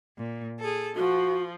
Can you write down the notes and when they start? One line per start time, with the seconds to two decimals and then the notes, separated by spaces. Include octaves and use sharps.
0.17 A#2
0.59 G#4 A4
0.96 F3 F#4